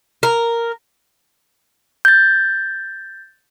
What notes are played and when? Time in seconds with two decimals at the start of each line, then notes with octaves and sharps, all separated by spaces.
0.23 A#4
2.05 G6 A6